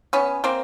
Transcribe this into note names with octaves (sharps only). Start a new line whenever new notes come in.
B3 C#4
A#3 C4